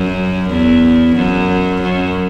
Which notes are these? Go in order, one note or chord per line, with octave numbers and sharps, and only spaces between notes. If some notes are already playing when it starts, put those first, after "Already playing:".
Already playing: F#2
E2
F#2
F#2